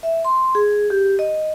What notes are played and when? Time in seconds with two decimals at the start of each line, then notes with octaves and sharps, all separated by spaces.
0.03 E5
0.25 C6
0.55 G#4
0.90 G4
1.19 D#5